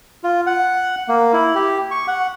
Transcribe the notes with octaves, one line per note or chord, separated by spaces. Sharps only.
F4
F#5
A#3
E4
G4
C#6
F#5